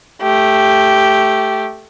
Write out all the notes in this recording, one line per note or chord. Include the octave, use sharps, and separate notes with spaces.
A3 G4